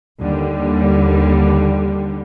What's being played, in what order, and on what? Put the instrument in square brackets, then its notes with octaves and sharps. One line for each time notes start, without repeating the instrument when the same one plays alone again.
[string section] D#2 D3 G3